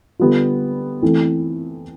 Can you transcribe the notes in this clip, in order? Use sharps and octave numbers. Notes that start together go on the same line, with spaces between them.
D3 G3 B3 F4
E3 A3 C4 E4